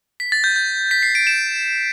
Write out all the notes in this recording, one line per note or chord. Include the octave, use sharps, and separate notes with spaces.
B6
A6
G6
G6
B6
C7
D7
E7